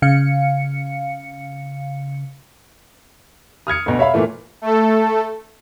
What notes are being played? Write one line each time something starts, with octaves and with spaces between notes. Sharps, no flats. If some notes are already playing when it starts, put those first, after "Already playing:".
C#3 F5 C#7
D#6 F6 G#6 C#7
D2 B2
C#5 E5 F5 B5
A#2 E3 A3
A3 A4